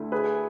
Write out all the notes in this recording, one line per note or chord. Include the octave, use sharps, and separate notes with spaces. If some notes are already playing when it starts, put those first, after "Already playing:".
Already playing: D2 D3 A3 E4
G#4 B4